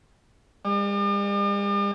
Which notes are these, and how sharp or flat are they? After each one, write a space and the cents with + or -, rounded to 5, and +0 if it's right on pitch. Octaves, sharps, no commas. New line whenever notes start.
G3 +45 D5 +45